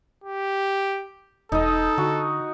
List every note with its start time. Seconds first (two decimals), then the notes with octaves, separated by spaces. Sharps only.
0.24 G4
1.52 E1 D#4 A4 D#5
1.98 D3 F#4